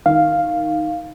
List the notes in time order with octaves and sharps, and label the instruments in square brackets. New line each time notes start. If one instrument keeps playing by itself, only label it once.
[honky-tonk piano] D#3 [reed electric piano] F5